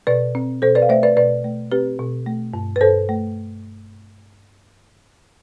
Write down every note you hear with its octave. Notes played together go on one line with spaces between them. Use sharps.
B2 B4 D5
C4
B2 A4 C5
B4 D5
F5
A3 C5 E5
B4 D5
B2 B4 D5
A3
C4 G4 B4
B2
A3
G2
B4
G2 A4 C5
A3